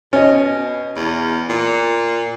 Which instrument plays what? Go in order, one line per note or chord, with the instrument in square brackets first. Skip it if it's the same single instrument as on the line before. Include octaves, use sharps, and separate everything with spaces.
[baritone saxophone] B2 [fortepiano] C#4 D#5
[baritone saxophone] E2
A#2